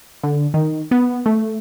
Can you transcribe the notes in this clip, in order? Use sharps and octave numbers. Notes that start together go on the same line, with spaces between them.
D3
D#3
B3
A3